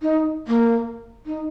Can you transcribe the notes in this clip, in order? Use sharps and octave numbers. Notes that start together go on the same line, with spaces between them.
D#4
A#3
D#4